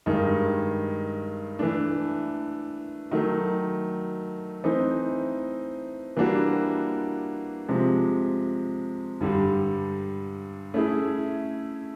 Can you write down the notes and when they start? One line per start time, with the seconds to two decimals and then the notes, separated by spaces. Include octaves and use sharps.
0.06 G2 D#3 G#3
1.59 E3 A3 D4
3.11 D#3 F#3 A3
4.64 E3 A3 C4 D#4
6.17 E3 G3 A#3 D4 F#4
7.69 C3 F3 G#3
9.21 G2 D3 G3
10.74 A3 C#4 E4 G#4